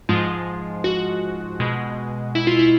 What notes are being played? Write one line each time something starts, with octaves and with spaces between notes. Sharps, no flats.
G#2 F3 G#3 F4
F#4
B2 G#3
E4
F4
E4